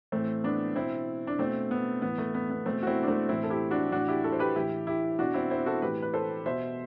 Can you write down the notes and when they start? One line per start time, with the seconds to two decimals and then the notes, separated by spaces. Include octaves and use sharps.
0.12 A2 E3 A3 C4
0.44 B3 D4
0.75 B2 C4 E4
1.27 D4
1.39 B2 A3 C4
1.71 B3
2.02 A2 E3 B3
2.18 A3
2.34 B3
2.50 B3
2.66 B2 A3 C4
2.83 F#4
2.87 C4 E4
3.03 D4
3.08 A3 C4
3.29 A2 E3 C4 E4
3.44 A4
3.50 E4 G4
3.71 D4 F#4
3.92 A2 E3 D4 F#4
4.08 E4 G4
4.24 F#4 A4
4.32 C5
4.39 G4 B4
4.56 A2 E3 E4 G4
4.87 E4 G4
5.19 B2 D4 F#4
5.34 C4 E4
5.50 C4 E4
5.66 F#4 A4
5.82 A2 E3 G4 B4
6.02 B4
6.14 A4 C5
6.45 B2 C5 E5